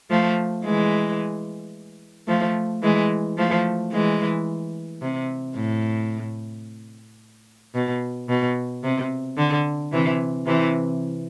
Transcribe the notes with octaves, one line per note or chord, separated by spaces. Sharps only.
F3 A3
E3 G#3
F3 A3
E3 G#3
F3 A3
E3 G#3
C3
A2
B2
B2
C3
D3
C3 E3
C3 E3